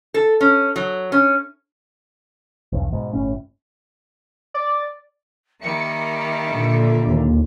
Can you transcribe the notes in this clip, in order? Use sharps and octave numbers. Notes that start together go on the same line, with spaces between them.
A4
C#4
F#3
C#4
B1 E2 G2
G#2 B2
G1 A2 C#4
D5
D#3 G3 A#3 E5 C#7
A#2 D3
D#2